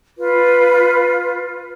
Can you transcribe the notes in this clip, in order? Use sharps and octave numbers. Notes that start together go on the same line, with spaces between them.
F4 B4